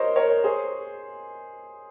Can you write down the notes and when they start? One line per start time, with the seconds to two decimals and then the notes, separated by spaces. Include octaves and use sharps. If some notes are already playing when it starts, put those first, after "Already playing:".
Already playing: A#4 C5 C#5 D#5
0.16 A#4 C#5
0.44 G#4 C5